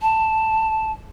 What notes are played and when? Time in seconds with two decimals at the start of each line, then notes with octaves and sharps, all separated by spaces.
0.02 A5